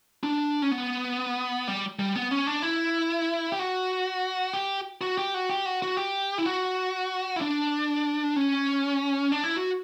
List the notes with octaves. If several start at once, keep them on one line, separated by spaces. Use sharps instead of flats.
D4
C#4
B3
G3
G3
B3
C#4
D4
E4
G4
F#4
G4
F#4
G4
F#4
G4
F#4
F#4
G4
E4
F#4
E4
D4
C#4
D4
E4
F#4